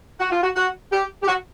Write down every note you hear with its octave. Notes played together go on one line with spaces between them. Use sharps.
F#4
F4
F#4
F#4
G4
G4
F#4